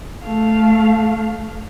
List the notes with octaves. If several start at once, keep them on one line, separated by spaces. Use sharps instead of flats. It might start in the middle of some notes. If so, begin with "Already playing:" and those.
A3 F5